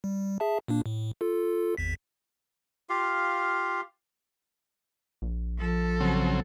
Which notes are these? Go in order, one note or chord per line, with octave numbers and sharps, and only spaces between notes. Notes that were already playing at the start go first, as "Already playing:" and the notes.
G3
G#4 E5 A5
A#2 A#3 D4
A2
F4 A4
G#1 E2 B6
F4 G4 F5
A#1
F3 A4
C#3 F#3 C4